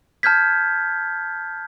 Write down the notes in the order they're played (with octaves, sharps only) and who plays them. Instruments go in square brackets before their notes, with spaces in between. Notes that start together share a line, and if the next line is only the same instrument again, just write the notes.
[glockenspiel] A5 F6 G6 G#6 B6